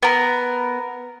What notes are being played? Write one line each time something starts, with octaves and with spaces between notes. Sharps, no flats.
B3 A#4